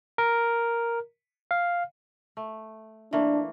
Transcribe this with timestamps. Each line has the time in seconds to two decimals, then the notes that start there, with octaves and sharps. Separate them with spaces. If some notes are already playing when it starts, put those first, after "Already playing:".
0.18 A#4
1.51 F5
2.37 A3
3.13 E3 A3 A#3 D4